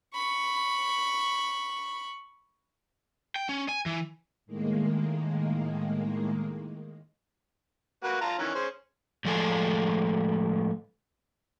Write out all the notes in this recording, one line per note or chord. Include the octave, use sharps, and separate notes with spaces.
B5 C#6
G5
C#4
G#5
E3
A2 D#3 G#3 A#3
A#3 F#4 B4
F4 A5 A#5
D#3 E3 C#4
C#4 G#4 C5
A2 F3 G#3 A4 G#5